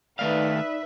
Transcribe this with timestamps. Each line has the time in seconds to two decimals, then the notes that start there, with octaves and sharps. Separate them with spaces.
0.19 D#3 A3 D#4 B4 D5 E5 F5